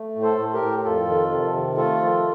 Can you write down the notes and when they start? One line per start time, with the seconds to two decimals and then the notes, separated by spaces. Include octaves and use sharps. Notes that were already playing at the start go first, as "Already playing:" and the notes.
Already playing: A3
0.16 A2
0.22 A4 C5
0.38 A2
0.53 G4 A#4
0.62 A2
0.84 F2 F4 A4
1.08 D#3
1.31 C3
1.55 D#3
1.77 A3 F4 A4
2.01 F3